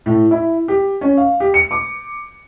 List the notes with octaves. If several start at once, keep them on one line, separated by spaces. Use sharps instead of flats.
A2
E4
G4
C#4
F5
G4
C#7
D6